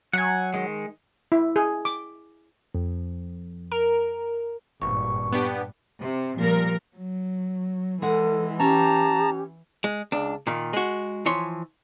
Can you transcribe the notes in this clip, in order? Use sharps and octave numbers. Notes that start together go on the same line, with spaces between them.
F#3 F#5 G#5
D#3 G#3
E4
G#4
D6
F2
A#4
G#1 G2 A#2 C#6
B3 D4 G4
C3
A#2 F3 G3 A#4
F#3
E3 G#3 A4 F#5
C#4 G4 A5 A#5
G#3
C#2 D4
A#2 D#3
G#3 F#4
E3 F3 C#5 C6